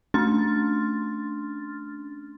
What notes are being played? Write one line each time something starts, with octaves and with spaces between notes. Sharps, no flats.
A3 C#4 D4 C6 F6 A6